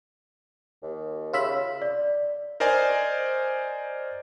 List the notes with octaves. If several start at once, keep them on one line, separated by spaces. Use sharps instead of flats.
D#2
C#3 F4 E5 B5
D5
A#4 C5 D5 D#5 G#5